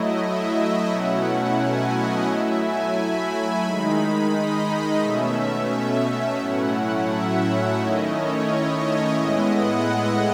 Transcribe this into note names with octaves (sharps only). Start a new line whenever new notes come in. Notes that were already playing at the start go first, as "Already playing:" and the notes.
Already playing: F#3 A3 E4 D#5
E5
B2 F#3 A3 C#4 E4 F#5
G#5
D#5
F#3 A3 E4 E5
G#5
B5
D#3 G#3 D#4 B5
D#5
D#5
B2 A3 C#4 E5
E5
E5
A2 F#3 A3 C#4 E4 F#5
E5
E5
D#3 A3 C#4 E4 D#5
C#5
D#5
A2 G#3 B3 E4
F#5
F#5